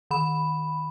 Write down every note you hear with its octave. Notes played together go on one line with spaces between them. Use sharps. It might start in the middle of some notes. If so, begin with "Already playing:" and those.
D#3 B5